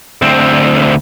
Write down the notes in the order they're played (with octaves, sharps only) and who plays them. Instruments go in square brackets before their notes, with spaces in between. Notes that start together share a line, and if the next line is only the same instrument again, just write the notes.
[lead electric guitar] D2 C4